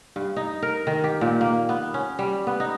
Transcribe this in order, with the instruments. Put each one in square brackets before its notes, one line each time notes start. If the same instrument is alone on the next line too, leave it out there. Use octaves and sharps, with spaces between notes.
[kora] G2
D#4
A#4
D#3
G4
A#2
A#3
B3
C#4
G3
B3
D#4